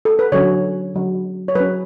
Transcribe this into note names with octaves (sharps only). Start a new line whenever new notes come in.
A4
B4
D3 F#3 C#4 C#5
D3 F#3 C#4
C#5
F#3 C#4 B4